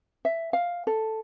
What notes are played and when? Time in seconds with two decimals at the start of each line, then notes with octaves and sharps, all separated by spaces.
0.25 E5
0.53 F5
0.87 A4